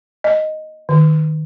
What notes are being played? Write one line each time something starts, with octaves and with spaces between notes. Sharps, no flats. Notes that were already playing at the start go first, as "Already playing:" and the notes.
D#5
D#3